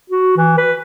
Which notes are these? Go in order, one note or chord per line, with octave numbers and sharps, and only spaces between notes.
F#4
E3
B4